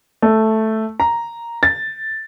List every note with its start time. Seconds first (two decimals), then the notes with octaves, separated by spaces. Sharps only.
0.22 A3
1.00 A#5
1.63 A6